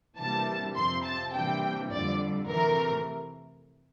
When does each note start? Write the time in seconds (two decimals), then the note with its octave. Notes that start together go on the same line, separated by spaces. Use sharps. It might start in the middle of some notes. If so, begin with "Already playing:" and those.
0.19 C3 E3 G3 A#3 D4 A5
0.76 F2 C3 F3 C4 C6
1.05 A5
1.34 C3 E3 G3 A#3 D4 G5
1.91 F2 D3 G3 D5
2.48 C3 E3 A3 A#4